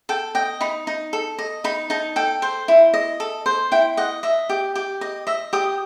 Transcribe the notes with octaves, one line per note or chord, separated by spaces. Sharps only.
A4 G5
D#5 G5
D#4 B5
D#4
A4
D#5
D#4 B5
D#4 A5
A4 G5
C5
E4
D#5
A4
C5
E4 G5
D#5 F#5
D#5 E5
G4
G4
D#5
D#5 E5
G4 D#6